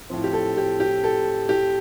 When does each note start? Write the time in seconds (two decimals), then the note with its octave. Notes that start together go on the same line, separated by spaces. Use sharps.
0.10 A2 F3 C4
0.24 G4
0.33 A4
0.57 G4
0.80 G4
1.04 A4
1.49 G4